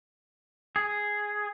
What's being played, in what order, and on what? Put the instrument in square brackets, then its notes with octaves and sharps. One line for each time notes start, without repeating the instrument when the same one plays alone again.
[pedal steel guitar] G#4